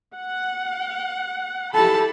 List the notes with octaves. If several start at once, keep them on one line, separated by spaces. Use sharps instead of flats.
F#5
E4 G4 A4 A5 B5